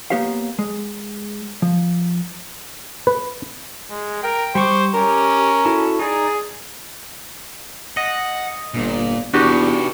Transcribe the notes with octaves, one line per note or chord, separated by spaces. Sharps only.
A#3 B3 G4 C#5 F5
G#3
F3
B4
G#3
A#4 G5
G3 C5 C#6 D6
C#4 G4 A#4
E4 F#4 A4
D#4 G#4 D5
D#5 F#5
G1 A#2
E2 D4 D#4 F#4 G4 B4